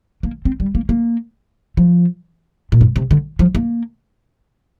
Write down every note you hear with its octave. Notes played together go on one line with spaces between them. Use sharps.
A#3
C4
G3
A#3
A#3
F3
A#2
G2
C3
D3
F3
A#3